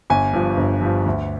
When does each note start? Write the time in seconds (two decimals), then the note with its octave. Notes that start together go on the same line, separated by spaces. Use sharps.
0.10 G1 G#5
0.33 G2 F3
0.57 G1
0.81 G2 F3
1.06 D2